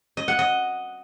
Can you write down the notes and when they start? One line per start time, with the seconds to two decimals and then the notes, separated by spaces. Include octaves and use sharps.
0.17 D#5
0.28 F#5
0.39 D#5